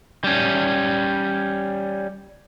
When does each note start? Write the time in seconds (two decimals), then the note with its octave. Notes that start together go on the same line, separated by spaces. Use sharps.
0.24 G3 C#4